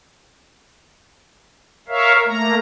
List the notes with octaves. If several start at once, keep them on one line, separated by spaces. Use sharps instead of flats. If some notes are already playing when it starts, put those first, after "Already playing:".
A#4 C#5 E5 F5
A3 A#3 A#5